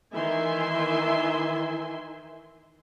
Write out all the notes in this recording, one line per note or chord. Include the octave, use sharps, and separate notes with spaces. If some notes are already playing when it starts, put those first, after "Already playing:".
D#3 E3 E5 G#5 C6